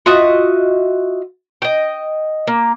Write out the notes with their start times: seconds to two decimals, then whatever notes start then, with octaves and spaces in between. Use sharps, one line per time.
0.06 F4 F#4 D#5 E5
1.62 D#5 G5
2.47 A#3